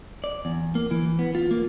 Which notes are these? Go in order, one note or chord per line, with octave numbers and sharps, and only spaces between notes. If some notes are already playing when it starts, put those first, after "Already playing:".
D5
E2
A#3
E3
B3
F4
A#3